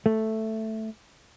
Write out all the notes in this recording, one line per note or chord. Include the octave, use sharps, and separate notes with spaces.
A3